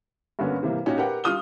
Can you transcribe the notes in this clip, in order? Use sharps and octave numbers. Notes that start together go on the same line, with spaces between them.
G2 D3 A#3 B3 C#4
C3 E3 G3 A#3
A#2 C#4 D#4 F#4 G4
G4 A#4 B4 F#5 G5
G3 F4 D#6 F6 G7